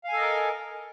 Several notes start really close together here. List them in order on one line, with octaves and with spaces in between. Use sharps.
F5 G#5 A4 D#5 A#4